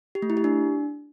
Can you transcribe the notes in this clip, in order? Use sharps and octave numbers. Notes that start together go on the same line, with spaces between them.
G4
A3
E4
G4
D4